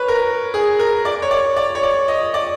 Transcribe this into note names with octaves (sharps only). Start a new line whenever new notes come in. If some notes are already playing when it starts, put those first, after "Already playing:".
Already playing: B4 C#5
A#4
G#4
A#4
D5
C#5
D5
D5
C#5
D5
D#5
D5